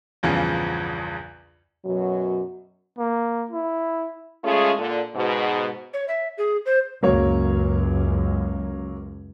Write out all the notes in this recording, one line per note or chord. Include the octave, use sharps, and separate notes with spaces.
A#1 E2 G2 C#3 E3 F3
F#2 B2 F#3
A#3
E4
G#3 A3 C#4 F4 G#4
A#2 D3
G#2 B2
C#5
E5
G#4
C5
C#2 F#2 F#3 A#3 C#5